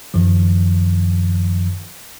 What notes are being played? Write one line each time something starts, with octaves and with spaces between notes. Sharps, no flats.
F#2 D#3 F3